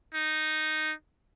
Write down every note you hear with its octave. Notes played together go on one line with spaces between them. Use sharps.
D#4